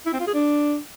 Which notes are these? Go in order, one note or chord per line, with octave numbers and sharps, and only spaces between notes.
E4
C4
F4
G#4
D4